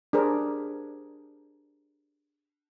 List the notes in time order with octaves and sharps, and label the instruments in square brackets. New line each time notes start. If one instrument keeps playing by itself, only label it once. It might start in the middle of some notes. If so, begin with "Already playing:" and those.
[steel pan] D4 G4 G#4 A#4 C5